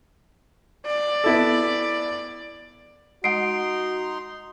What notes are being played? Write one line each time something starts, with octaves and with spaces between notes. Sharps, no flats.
D5
B3 E4 A4
G#3 D#4 F#4 F#5 C6 C7 D7